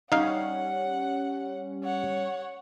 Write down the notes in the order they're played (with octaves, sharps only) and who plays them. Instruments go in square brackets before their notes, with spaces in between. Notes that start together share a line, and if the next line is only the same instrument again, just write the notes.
[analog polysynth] G3 C#4 [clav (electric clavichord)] D#4 F5 [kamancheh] F#5
[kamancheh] C#5 F#5